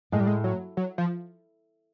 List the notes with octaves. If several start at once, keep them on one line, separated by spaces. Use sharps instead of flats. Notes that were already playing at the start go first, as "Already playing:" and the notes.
A2 G#3
G3
G#3
F#3
F#3
F3